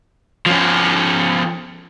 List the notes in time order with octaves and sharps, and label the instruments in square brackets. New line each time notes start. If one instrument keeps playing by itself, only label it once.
[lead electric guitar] F3 C#4